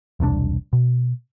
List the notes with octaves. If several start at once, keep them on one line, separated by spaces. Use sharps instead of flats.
E1 C2 D3 D4
B2